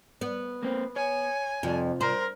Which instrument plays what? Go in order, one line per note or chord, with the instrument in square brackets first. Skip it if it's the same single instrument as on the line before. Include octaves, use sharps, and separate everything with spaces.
[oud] B3
[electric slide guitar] A#3 C4
[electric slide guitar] C#5 [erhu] G#5
[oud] F2 [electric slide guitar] C3 F4
[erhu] A#4 [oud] C5